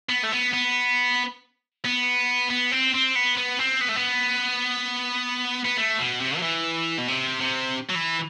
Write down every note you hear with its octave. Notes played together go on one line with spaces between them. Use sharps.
B3
A3
B3
B3
B3
B3
C4
C4
B3
B3
C4
B3
A3
B3
B3
A3
B2
C3
F#3
E3
B2
C3
C3
F#3
E3